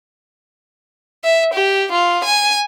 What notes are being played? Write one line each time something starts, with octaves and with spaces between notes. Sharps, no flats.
E5
G4
F4
G#5